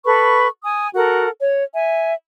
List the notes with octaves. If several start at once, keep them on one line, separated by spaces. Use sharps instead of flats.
A4 B4 B5 C#6
G#5 D#6
F#4 A4 A#4 F#5
C#5
E5 G#5